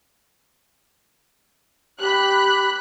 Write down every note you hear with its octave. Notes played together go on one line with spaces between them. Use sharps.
G4 B5 F#6